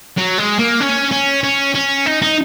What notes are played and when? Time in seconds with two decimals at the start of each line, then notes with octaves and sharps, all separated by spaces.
0.18 F#3
0.38 G#3
0.59 A#3
0.81 C#4
1.11 C#4
1.43 C#4
1.75 C#4
2.06 D#4
2.22 D#4